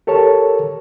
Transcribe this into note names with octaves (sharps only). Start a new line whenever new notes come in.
G4 A4 A#4 C#5 A5